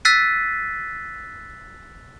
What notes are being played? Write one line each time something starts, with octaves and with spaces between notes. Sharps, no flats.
E6 F#6 A6 B6 C7 D#7